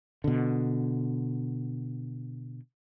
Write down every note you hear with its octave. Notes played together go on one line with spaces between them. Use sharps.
B2 D3